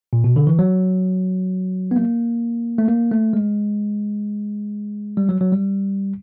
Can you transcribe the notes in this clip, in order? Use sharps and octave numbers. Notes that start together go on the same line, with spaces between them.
A#2
B2
D3
E3
F#3
B3
A#3
A3
A#3
A3
G#3
G3
F#3
F#3
G3